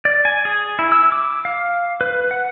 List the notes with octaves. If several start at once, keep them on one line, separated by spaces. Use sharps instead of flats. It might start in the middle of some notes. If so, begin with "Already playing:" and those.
D5
G#5
G#4
E4
E6
D6
F5
B4
F#5